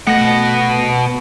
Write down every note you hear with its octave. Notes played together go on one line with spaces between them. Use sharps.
B2 A3 F#5 A#6